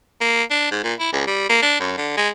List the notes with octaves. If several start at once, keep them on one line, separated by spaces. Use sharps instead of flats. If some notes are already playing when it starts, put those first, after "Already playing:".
A#3
D4
G#2
A#2
E4
C#2
G3
A#3
D4
F#2
D3
G#3